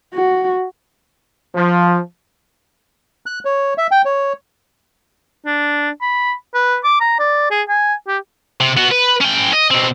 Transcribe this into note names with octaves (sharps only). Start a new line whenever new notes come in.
F#4
F3
F#6
C#5
E5
G5
C#5
D4
B5
B4
D6
A#5
D5
G#4
G#5
G4
C3
B3 F#4
B4
C#4 G5
D#5
B2 C4